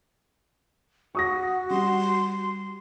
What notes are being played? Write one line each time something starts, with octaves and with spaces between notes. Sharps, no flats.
F#4 C#6 D#6 A#6
G3 C6